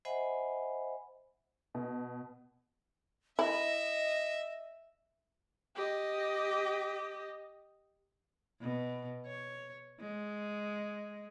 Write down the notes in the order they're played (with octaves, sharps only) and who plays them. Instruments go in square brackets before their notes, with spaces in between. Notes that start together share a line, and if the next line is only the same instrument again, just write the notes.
[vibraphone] C5 D#5 E5 F#5 G#5 B5
[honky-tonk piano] B2
[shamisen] E4 [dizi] D#5 [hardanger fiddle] E5
[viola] G4 D#5
[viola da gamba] B2
C#5
G#3